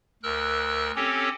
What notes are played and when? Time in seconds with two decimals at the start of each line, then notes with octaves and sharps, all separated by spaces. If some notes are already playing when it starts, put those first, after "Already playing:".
0.23 D2 A#4 E6 F#6
0.96 C4 C#4 G4 A4 C#5